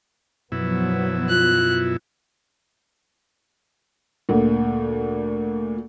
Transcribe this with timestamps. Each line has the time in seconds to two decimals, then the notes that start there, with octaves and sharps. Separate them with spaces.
0.52 F#2 B2 F3 F#3 B3 E4
1.29 F4 F#6
4.29 D2 A#2